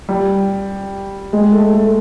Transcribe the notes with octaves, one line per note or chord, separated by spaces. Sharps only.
G3
G#3
A3
A3